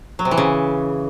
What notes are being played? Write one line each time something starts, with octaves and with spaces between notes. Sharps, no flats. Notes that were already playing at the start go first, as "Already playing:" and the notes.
F#3
C3
E3
C#3